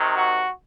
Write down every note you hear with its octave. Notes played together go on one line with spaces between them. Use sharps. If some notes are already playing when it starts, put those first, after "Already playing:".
Already playing: C3 D#3 F#3
F#4